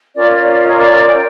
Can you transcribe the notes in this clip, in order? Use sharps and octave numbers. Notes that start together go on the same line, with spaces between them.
C#4 F4 A#4 C#5 D5
D5
D5
D#5
D5
G5